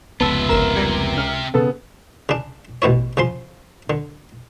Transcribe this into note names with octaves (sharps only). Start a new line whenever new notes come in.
F1 C#2 B3 F4 E5 A5
G1 A#4 E7
C3 G3 G#6
C#2 F6
C#3 B3 A4
C#3 D4
A1 B2 E4 C#5
C#3 F3 C6
D3